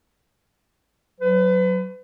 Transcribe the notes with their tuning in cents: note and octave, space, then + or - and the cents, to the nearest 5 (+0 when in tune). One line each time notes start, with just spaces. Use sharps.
F#3 +0 B4 +35